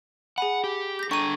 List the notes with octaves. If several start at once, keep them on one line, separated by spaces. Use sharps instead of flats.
G#4 F#5 G#5 B5
G4
G6 A#6
D4 A4 A#5 C#6 D#7